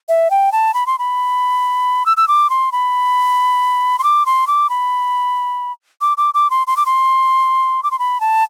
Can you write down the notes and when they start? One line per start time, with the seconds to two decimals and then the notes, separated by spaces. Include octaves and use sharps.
0.09 E5
0.31 G5
0.52 A5
0.74 B5
0.87 C6
0.99 B5
2.06 E6
2.17 E6
2.28 D6
2.50 C6
2.72 B5
3.99 C6
4.04 D6
4.26 C6
4.47 D6
4.70 B5
6.01 D6
6.17 D6
6.34 D6
6.50 C6
6.67 C6
6.77 D6
6.86 C6
7.83 D6
7.91 C6
7.99 B5
8.21 A5